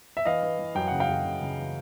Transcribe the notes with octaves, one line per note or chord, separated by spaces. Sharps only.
E5
E3 D#5 F5
E3
E3
F#2 G5
C#3 F#5
F5 G5
F#2
C#3
C#3
E3